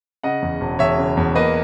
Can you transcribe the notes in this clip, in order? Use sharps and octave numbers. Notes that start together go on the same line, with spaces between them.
C#3 D#5 F#5
E2
E1
E1 C#5 E5
C#3
E2
A#3 B4 D#5